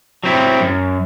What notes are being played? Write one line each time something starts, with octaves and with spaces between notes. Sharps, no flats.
F#3 C4 E4
F#2